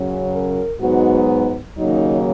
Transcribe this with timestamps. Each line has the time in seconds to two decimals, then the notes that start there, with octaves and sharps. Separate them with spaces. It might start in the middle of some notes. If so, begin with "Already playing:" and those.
Already playing: F#2 C#3 F#3
0.32 A#4
0.79 G#2 F#3 B3 D#4 F#4
1.78 D#2 C#3 F#3 A#3 D#4